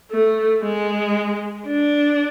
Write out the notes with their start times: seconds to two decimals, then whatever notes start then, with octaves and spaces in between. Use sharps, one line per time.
0.11 A3
0.63 G#3
1.67 D4